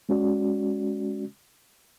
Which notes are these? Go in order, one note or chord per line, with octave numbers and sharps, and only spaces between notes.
G#3 C#4 F#4 D5